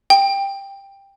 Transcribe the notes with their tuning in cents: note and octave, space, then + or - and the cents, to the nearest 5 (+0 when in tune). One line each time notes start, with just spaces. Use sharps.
G5 +10